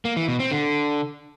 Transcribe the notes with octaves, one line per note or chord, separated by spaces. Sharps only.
A#3
E3
B2
C4
D3